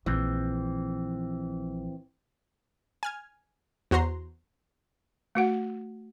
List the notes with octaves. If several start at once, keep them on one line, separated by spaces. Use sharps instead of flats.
A#1 E3 C4
G#5 F6 G#6
E2 F#4 C5 A#5 C6
A3 F#4 F#5